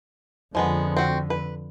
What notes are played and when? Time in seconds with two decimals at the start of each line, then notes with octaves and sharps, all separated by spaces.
0.55 F2 D3 F3 G#3 B3
0.97 C4 F#4
1.30 B4